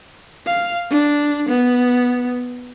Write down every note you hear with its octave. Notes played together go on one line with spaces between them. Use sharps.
F5
D4
B3